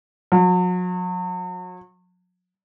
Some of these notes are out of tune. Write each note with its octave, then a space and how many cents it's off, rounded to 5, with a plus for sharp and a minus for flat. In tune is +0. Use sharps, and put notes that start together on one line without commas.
F#3 -40